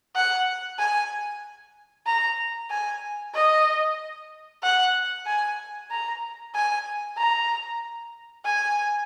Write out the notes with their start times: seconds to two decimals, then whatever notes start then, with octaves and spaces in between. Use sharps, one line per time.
0.16 F#5
0.78 G#5
2.07 A#5
2.70 G#5
3.34 D#5
4.63 F#5
5.26 G#5
5.91 A#5
6.55 G#5
7.18 A#5
8.45 G#5